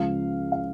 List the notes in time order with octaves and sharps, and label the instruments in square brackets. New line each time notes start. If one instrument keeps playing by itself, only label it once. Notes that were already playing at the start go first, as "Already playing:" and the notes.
Already playing: [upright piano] C#2 C#3 F3 F5
F5